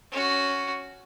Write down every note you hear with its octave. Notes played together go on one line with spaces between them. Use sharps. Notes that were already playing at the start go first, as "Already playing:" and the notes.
C#4 F#4